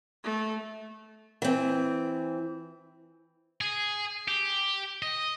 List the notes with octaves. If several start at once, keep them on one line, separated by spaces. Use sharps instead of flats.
A3
E3 C4
G#4
G4
D#5